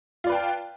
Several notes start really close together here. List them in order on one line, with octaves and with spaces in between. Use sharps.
F4 D5 B4 G5 A5